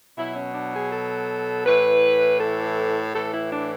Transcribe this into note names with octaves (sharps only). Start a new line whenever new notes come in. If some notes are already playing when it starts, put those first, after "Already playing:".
B2 F#3 E4
C#4
D4
G#4
A4
A2 E3 B4
A4
A2 E3 A4
E4
D4